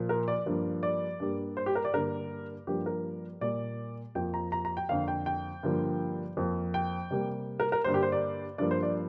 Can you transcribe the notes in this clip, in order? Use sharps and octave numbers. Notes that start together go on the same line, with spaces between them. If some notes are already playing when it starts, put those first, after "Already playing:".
Already playing: A#2 F3 A#3
A#4
D5
G2 F3 A#3
D5
G2 G3 A#3
C5
G4
A#4
D5
G2 D3 A#3 A#4
G2 F3 A#3 G4
A#4
A#2 G3 A#3 D5
F2 F3 A#3 G5
A#5
A#5
A#5
G5
F2 D3 A#3 F5
G5
G5
G2 D3 F3 A#3
F2 F3 A#3
G5
C3 G3 A#3
A#4
A#4
G2 D3 G3 A#3 C5
G4
C5
D5
G2 F3 A#3 D5
C5
D5